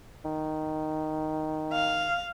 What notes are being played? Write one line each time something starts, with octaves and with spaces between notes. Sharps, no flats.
D#3
F5